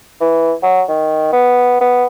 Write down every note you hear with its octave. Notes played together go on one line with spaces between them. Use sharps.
E3
F#3
D#3
B3
B3